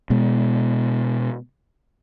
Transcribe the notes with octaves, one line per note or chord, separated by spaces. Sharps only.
B2 G#3